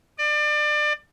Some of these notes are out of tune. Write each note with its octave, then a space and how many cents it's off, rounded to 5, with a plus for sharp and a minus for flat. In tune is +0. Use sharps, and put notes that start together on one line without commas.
D5 +30